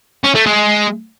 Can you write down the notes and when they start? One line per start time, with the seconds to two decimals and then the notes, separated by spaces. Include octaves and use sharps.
0.24 C#4
0.35 A3
0.46 G#3